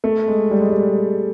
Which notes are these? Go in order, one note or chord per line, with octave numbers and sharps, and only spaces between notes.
A3
G#3
G3
G#3
G3